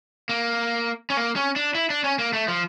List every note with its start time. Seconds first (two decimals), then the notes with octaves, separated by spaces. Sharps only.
0.29 A#3
1.10 C#4
1.17 A#3
1.36 C#4
1.56 D4
1.75 E4
1.90 D4
2.04 C#4
2.19 A#3
2.33 A3
2.48 F3